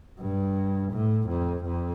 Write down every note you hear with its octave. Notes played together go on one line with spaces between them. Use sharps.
G2
A2
F2
F2